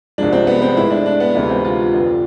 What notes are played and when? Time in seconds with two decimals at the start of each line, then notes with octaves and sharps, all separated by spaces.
0.18 C2 C3 F3 G#3 D4
0.33 C4
0.47 B3
0.62 C4
0.76 A2 G#3 E4
0.91 D4
1.06 D4
1.20 B3
1.35 D2 C3 E3 G#3 B3
1.49 C4
1.65 F4
1.93 F2 D3 F3